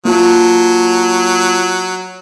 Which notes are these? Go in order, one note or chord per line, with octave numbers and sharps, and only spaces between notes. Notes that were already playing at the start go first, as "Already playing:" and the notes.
F#3 A#3 F4 A5